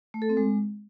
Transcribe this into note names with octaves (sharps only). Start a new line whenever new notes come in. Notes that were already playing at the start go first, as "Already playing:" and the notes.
A3
A4
C4
G#3